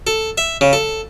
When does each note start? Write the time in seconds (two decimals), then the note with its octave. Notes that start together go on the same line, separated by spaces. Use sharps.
0.07 A4
0.38 E5
0.61 C#3
0.73 A4